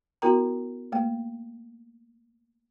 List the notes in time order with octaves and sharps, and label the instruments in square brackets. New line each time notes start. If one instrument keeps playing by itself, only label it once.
[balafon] B3 E4 F#4 A#4 G5 A#5
A3 A#3 G5